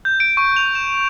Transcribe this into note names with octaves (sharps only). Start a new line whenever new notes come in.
G6
D7
C#6
F7
E7